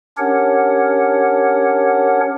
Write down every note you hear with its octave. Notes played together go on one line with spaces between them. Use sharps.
C#4 D4 G4 A#4 C#5 F#5